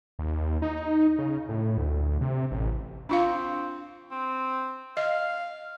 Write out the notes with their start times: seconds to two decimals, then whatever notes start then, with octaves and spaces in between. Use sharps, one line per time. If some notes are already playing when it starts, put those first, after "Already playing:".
0.19 D#2
0.62 D#4
1.18 C#3
1.49 A2
1.77 D2
2.21 C3
2.51 A1
3.09 C4 D4 F4 F5
4.11 C4
4.97 D#5 F5